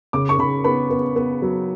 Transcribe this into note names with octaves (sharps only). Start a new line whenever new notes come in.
C#3 D6
C#6
C#3 B5
B3 B5
B3
B3
F#3